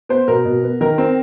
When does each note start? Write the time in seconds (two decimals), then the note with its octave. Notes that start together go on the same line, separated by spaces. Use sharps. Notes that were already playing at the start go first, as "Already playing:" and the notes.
0.09 B3 C5
0.28 B2 A#4
0.45 B2
0.64 B3
0.81 D#3 A#4
0.98 C4